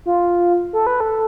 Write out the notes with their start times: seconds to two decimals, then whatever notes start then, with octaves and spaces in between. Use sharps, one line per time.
0.06 F4
0.73 A4
0.87 B4
1.00 A4